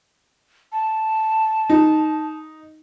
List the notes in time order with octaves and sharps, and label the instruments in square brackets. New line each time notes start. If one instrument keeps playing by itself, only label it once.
[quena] A5
[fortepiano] D#4